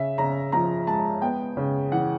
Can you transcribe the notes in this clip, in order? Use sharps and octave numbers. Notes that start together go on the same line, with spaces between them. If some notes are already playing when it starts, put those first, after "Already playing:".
Already playing: C#3 E5
C#3 A#5
F3 A#5
G#3 A5
B3 G5
C#3
E3 F#5